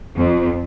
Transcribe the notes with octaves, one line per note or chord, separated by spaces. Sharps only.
F2